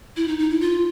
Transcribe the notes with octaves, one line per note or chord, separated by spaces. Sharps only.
E4
D#4
D#4
E4
F4